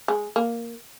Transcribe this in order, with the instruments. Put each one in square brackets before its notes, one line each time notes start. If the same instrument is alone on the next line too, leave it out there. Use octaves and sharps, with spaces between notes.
[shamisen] G#3
A#3